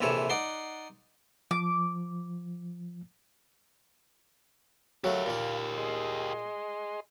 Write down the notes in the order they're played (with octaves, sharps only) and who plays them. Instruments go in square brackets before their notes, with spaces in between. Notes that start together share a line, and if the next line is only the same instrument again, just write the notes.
[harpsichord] A#1 C3 E3 A4 C#5
D#4 D5 F#5 C6
[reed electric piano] F3 [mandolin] D6
[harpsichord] F#3 A3 [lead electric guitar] G4 A#4 [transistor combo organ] F5
[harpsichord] A#2 A#3
[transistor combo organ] G#4 D#5 C6